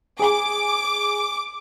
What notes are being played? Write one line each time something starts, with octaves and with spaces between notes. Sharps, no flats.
G#4 G#5 D6